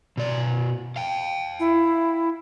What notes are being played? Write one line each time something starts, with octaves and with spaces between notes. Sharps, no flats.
B2 D5
F5 G5
E4